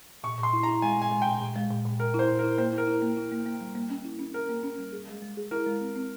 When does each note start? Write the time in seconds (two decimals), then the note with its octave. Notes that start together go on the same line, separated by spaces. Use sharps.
0.24 A#2 C#6
0.38 A#2 C6
0.53 E4
0.63 A#5
0.68 E4
0.82 G#3 G#5
0.97 A#2 G#5
1.12 G#3
1.22 A#2 G5
1.41 A#2
1.56 G#3
1.70 A#2
1.85 A#2
2.00 A#2 A#4
2.14 E4 C5
2.29 A#2
2.39 A#4
2.44 E4
2.58 A#3 C5
2.72 E4
2.78 A#4
2.87 E4
3.02 A#3
3.17 E4
3.32 A#3
3.46 A#3
3.61 G3
3.75 A#3
3.90 C#4
4.05 E4
4.19 C#4
4.34 C#4 A#4
4.49 A#3
4.63 C#4
4.78 G3
4.93 G#4
5.07 G#3
5.22 G#3
5.37 G#4
5.51 E4 A#4
5.66 G#3
5.81 C4
5.95 C4